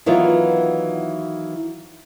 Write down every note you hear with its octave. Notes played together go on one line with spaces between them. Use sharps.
D#3 E3 F#3 B3 F4